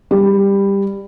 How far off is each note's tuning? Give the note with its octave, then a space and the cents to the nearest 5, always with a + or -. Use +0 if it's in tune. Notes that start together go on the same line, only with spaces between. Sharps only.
G3 +15